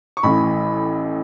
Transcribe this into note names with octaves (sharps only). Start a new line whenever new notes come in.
C#6
A1 A2 E3 B5